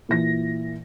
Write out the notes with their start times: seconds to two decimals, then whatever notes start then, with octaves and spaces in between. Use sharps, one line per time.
0.09 A#2 E3 A#6